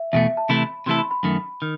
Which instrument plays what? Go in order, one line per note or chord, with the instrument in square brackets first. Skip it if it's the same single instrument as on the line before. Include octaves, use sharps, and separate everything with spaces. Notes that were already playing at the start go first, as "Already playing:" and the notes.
Already playing: [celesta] E5
[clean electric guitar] E2 B2 A3 [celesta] E5
[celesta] A5
[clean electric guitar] C3 E3 A3 E4 A4 [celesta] B5
[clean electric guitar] C3 E3 A3 E4 A4 [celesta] C6
[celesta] B5
B5
[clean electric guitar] F#2 D#3 A3
D#3